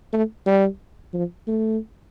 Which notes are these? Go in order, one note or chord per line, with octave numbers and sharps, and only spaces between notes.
A3
G3
F3
A3